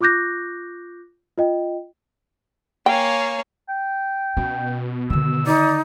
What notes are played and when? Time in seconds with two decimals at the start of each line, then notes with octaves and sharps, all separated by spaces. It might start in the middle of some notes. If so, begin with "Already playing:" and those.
0.01 F4 C#6 D6 F#6 G6 A#6
1.38 F4 D#5 G5
2.86 A#3 C#5 F5 G5 G#5
3.69 G5
4.37 B2 C#4
5.10 D3 D#3 E6
5.46 D#4 D5